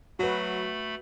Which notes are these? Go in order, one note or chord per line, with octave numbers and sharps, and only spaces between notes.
F#3 A3 F#4 B4 B5